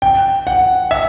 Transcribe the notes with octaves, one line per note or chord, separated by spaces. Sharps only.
G5
F#5
E5